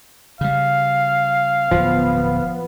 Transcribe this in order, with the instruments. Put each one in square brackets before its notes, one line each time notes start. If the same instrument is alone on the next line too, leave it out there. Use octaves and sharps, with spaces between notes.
[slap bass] C#3 G3 [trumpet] F5
[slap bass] D1 [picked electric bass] F3 [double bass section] B3